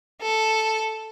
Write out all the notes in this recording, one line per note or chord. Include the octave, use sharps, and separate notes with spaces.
A4